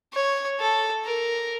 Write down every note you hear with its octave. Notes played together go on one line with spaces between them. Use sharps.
C#5
A4
A#4